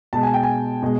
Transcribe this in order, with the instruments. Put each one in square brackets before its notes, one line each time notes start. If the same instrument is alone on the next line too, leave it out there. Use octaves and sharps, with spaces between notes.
[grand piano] B2 G#3 A5
G#5
G5
G#5
B2 G#3